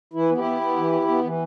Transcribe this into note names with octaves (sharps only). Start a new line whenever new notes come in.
E3 E4
B3
E4 G4
B3
B3
E3
B3
B3
E3